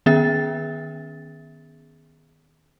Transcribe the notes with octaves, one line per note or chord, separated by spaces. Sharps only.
D#3 B3 C#4 G#4 E5 A6